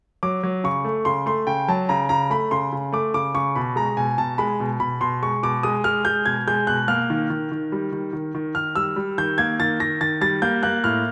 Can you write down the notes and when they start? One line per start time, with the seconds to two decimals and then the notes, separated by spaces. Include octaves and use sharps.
0.23 F#3 D6
0.43 F#3
0.64 C#3 C#6
0.84 A3
1.05 C#3 C6
1.26 A3 C6
1.47 C#3 G5
1.68 F#3 A5
1.89 C#3 A#5
2.09 C#3 A#5
2.30 A3 B5
2.51 C#3 C6
2.73 C#3
2.92 A3 D6
3.14 C#3 D6
3.34 C#3 C#6
3.56 B2 B5
3.76 G#3 A#5
3.97 B2 G#5
4.18 B2 A5
4.38 G#3 B5
4.60 B2
4.80 B2 B5
5.01 B2 C6
5.23 G#3 C#6
5.43 B2 D6
5.63 G#3 D#6
5.84 G#3 F6
6.05 G#3 G6
6.26 B2 G#6
6.48 G#3 G6
6.67 B2 F#6
6.88 A#3 F6
7.10 D#3
7.30 D#3
7.52 D#3
7.72 G3
7.93 D#3
8.13 D#3
8.35 D#3
8.55 D#3 F6
8.75 G3 E6
8.96 G3
9.18 D#3 G6
9.38 A#3 G#6
9.60 D#3 A6
9.80 D#3 A#6
10.01 D#3 A6
10.21 G3 A6
10.42 A#3 G6
10.63 A#3 F#6
10.84 A2 F6